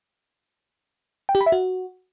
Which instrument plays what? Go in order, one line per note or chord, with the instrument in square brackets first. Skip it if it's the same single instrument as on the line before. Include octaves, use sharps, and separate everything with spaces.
[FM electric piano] G5
G4
B5
E5
F#4